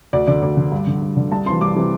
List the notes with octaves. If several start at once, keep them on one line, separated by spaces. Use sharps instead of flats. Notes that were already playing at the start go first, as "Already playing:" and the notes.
D2 D5
D3 D5
D2 D5
D3
G2
D3
G2
D3
C2 A5
C3 E3 C6
C2 D6
C3 E3